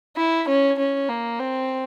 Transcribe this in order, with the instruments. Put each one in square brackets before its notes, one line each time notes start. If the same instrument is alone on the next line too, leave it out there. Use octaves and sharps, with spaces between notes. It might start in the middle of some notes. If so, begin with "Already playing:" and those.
[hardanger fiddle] E4
C#4
C#4
A#3
C4